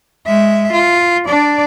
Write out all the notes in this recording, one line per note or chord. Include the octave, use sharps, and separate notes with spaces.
G#3 E5
F4
D4 D5